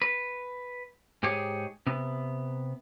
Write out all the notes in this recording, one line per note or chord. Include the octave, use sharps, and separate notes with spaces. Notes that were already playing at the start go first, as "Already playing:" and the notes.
B4
G#2 G4 G#4 C#5
C3 B3